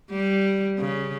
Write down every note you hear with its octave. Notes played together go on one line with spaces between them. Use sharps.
G3
C#3